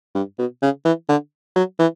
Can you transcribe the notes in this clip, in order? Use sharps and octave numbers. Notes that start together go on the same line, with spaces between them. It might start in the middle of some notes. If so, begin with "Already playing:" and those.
G2
B2
C#3
E3
D3
F#3
E3